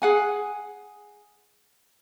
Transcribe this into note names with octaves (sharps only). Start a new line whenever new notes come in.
G#4 F#5 G#5